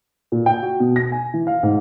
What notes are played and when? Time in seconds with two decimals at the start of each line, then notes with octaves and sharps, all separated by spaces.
0.32 A#2
0.46 G5
0.63 F#4
0.80 B2
0.96 A#6
1.12 G#5
1.34 E3
1.47 F5
1.63 G#2